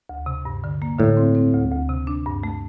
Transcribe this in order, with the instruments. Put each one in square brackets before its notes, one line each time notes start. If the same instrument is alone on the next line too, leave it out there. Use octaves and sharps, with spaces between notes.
[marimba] D2
C3
G2
D3
A#3
[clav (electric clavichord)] A2 [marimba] D3
[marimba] C4
C4
D2
D2
C3
D4
G2
A3